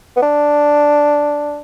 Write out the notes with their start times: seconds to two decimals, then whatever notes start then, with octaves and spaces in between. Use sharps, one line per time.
0.17 B3
0.22 D4